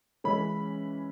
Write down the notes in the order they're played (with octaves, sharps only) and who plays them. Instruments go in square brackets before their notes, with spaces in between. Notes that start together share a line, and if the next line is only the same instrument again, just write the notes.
[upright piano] C#3 E3 G#3 C#4 B5